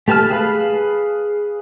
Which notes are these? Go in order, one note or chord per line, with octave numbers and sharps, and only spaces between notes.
A3 G4 B4 A5 F6
G#4 B4 F5 B5